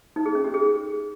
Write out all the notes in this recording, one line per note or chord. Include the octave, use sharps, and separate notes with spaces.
D#4
G#4
C#4
G4
G#4